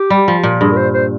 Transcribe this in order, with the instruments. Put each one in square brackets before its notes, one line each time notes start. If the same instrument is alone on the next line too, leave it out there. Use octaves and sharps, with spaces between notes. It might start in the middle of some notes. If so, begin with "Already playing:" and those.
Already playing: [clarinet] G4
[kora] G3
F3
A#2
[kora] G2 [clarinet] G#4
[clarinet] A#4
C5
C5